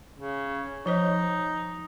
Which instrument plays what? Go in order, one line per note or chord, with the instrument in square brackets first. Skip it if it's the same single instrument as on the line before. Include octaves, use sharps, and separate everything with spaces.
[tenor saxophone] C#3
[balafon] F3 C5 D#5 [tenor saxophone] D#4